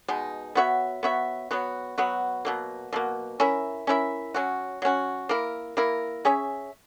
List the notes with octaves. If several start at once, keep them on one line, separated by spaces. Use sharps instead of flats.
B2 G#3 D#4
B3 F#4 C#5 E5
B3 F#4 C#5 E5
F#3 B3 F#4
F#3 B3 F#4
B2 F#3 A#3
B2 F#3 A#3
C#4 E4 A#4 E5
C#4 E4 A#4 E5
F#3 C#4 F#4
F#3 C#4 F#4
A#3 E4 A#4
A#3 E4 A#4
C#4 G#4 C#5 E5